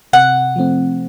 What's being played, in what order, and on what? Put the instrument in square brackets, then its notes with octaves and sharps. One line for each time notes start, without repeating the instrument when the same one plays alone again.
[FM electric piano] C3 [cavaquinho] F#5
[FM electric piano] F3 A3 C4